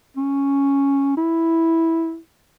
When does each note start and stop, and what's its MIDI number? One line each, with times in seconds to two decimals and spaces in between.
0.17 1.17 61
1.17 2.17 64